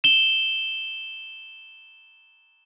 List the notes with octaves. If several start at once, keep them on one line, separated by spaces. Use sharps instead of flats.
E7 G7